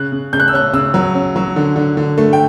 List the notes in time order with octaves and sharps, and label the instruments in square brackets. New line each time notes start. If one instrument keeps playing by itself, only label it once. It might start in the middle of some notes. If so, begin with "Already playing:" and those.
Already playing: [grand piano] C#3 F#6
C#3
C#3 G6
F#6
E6
C#4 F#6
C#3 E6
F#3
C#4
F#3
D3
D3
D3
A3
G5